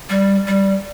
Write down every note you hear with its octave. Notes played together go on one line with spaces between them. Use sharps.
G3
G3